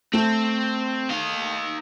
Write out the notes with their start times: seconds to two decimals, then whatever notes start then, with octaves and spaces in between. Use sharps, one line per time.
0.13 A3 C4
1.10 D#4 F5